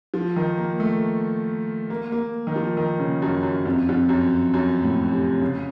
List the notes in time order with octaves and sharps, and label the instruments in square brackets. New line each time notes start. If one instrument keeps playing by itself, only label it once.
[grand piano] F3
D#3
A#3
A3
A#3
A#3
D#3
F3
D#3
C#3
F#2
F#2
F2
F2
F#2
F#2
A2
C3
C#3